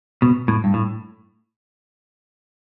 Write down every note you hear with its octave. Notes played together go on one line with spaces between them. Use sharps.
B2
A2
G2
A2